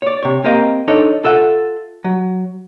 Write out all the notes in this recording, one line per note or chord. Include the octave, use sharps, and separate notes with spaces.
C#5 D5
C3 C#5
A#3 C4 G4 A#4 D#5 F5
D4 D#4 A4 C#5
F4 A4 E5 F#5
F#3